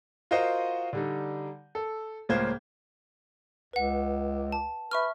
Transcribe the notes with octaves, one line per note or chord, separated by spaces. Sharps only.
F4 F#4 A#4 C5 D#5 F#5
D3 G3 D#4
A4
C#2 A2 A#3 F4 C5 G#6
C#2 B4 F#5
A5
B4 E5 C#6 F6